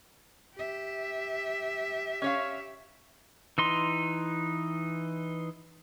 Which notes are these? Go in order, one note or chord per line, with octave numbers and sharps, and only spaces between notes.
G4 E5
C#4 C#5 F5
E3 D#4 C6